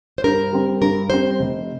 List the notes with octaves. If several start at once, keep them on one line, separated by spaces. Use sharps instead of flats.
C5
G2 A#4
G3 C4
G2 A#4
G3 C4 C5
F1